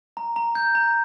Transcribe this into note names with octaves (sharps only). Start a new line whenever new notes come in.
A#5
A#5
G6
A#5